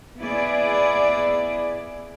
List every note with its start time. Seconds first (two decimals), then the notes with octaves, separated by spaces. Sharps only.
0.20 B3 E4 G#4 D5